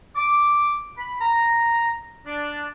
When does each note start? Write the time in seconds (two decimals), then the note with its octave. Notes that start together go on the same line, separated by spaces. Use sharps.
0.15 D6
0.97 B5
1.21 A#5
2.26 D4